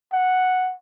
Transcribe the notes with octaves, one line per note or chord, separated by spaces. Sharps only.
F#5